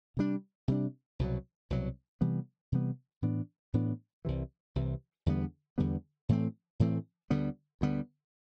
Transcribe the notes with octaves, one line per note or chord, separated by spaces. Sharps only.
C3 G3 D4
C3 G3 D4
C2 B2 F#3
C2 B2 F#3
C3 E3 G3 B3
C3 E3 G3 B3
A2 E3 B3 D4
A2 E3 B3 D4
C2 C3 E3
C2 C3 E3
E2 D3 G3 B3
E2 D3 G3 B3
A2 E3 A3 C4
A2 E3 A3 C4
D2 D3 G3 B3
D2 D3 G3 B3